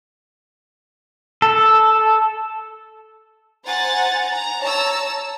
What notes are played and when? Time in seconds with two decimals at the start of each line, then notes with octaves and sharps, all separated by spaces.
1.42 A4
3.66 C5 F#5 G#5 A#5 A6
4.29 A#5
4.61 C#5 A5 A#5 E6